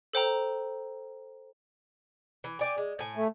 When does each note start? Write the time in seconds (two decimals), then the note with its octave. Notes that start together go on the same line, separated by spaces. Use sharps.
0.13 A4 C5 G5 A#5
2.44 E3
2.59 G4 D5 G#5
2.78 G#3
2.99 A2 G#5
3.16 A3